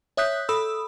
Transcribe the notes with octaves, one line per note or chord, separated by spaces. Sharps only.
C#5 E5 D#6 F#6 G6 B6
A4 B5 D#6 E6